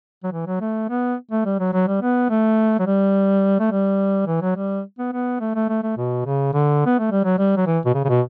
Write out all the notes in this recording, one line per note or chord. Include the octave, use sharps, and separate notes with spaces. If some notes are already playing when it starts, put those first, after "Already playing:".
F#3
E3
F#3
A3
B3
A3
G3
F#3
F#3
G3
B3
A3
F#3
G3
A3
G3
E3
F#3
G3
B3
B3
A3
A3
A3
A3
B2
C#3
D3
B3
A3
G3
F#3
G3
F#3
E3
B2
C#3
C#3
B2